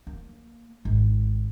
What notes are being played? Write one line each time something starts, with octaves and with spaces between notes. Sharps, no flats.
A#3
G#1